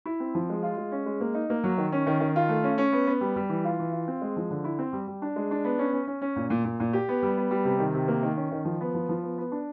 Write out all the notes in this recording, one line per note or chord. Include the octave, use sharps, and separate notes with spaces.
E4
C4
F3
G#3
F4
G#3
C#4
G#3
A#3
D#4
A#3
F#3
D#3
C#4
D#3
D#3
F4
A3
C#4
C#4
B3
B3
G3
G3
E3
F4
E3
F4
C4
G#3
F3
D3
E4
C4
G3
G3
D4
G#3
D4
B3
C#4
C#4
C#4
C#4
A#2
A#2
A#2
A#2
G4
B3
G3
B3
G3
C3
D#3
C3
A#3
D#3
C#4
D#3
F3
B3
F3
F3
B3
B3
D4